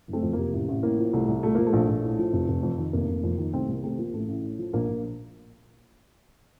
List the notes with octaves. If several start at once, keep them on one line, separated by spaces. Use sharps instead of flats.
F#1
A3 C4
F2
C3 A#3
A1
A1
A2 A#3
F3
C2 A3
C2
A#2 A3
F3 A#3
A3
A#1
A#1
A2
F3
F1
F1
F2
D#3
F1 A#3
F1
F2
D#3
C2 A3 C4
C2 A#3
C3 A3 C4
F3 A#3
A1 A3
A1
A2
F3
A#1 A#3
A#1